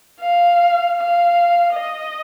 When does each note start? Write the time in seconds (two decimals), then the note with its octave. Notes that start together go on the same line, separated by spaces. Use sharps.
0.21 F5
0.97 F5
1.74 D#5